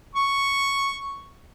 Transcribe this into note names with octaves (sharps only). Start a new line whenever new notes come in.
C#6